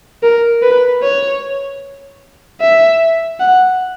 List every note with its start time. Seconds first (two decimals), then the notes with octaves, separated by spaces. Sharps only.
0.23 A#4
0.62 B4
1.02 C#5
2.61 E5
3.40 F#5